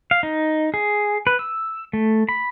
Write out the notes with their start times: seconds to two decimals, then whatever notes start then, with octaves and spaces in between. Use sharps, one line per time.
0.11 F5
0.23 D#4
0.74 G#4
1.27 B4
1.39 E6
1.93 A3
2.29 B5